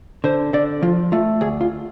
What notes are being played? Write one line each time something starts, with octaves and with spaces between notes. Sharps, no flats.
D3 C5
D3 D5
F3 F4
A3 F4
D2 G#4
F4